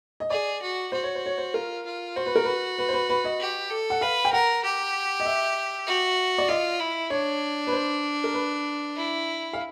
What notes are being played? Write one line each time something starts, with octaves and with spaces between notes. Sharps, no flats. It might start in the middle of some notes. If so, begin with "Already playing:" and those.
D#5
G#4 D5
F#4
F#4 C5
C#5
C5
C#5
C5
F4 A#4
F4
F#4 C5
B4
A#4
B4
B4
C5
B4
B4
D#5
G4
A4
F#5
B4 F5
G5
A#4 F#5
G4
D#5
E5
F#4
D5
F4 D#5
E4
D4 C#5
B4
C5
A#4
B4
E4
F5